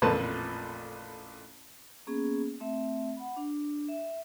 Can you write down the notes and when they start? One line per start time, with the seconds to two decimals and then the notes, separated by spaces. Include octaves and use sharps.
0.02 A1 F2 A#2 B4 A5
2.07 A#3 B3 C#4 G#4
2.60 A3 C4 E5
3.17 F#5 B5
3.37 D4
3.89 E5